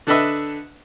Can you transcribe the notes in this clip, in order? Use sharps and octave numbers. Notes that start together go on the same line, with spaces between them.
D3 D4 A4 B4 D#5 E5